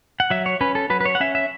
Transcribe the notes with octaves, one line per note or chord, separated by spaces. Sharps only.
F#5
F#3 E5
C#5
C#4 B4
A4
F#3 B4
B4
C#5
F#5
C#4 E5
E5